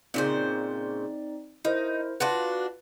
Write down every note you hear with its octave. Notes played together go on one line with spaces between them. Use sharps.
A#2 C#3 C4 D#4 C5 D5
D#4 E4 A#4 C5
D4 F4 F#4 B4